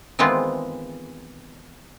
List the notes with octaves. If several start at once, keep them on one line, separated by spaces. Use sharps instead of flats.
D#3 E3 G#3 B3 C4 F4